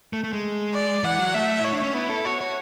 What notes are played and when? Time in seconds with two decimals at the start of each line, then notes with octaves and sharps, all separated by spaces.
0.13 A3
0.24 A3
0.33 G#3
0.74 D5
1.03 E3 F#5
1.19 F#3
1.34 A3 E5
1.60 E4 C#5
1.73 D4
1.83 C#4
1.94 B3 E4
2.09 A4
2.25 F#4 C#5
2.41 C#5